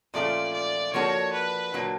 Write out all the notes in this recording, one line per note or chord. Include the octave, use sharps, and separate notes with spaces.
A#2 F3 A3 C#4 F4 D5
D5
F3 A#3 D4 F#4 A4 C#5
B4
A#2 F#3 A#3 D4